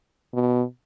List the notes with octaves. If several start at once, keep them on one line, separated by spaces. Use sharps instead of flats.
B2